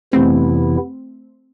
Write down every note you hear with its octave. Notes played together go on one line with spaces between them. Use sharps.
F2 C3 E3 A3 B3 C4 E4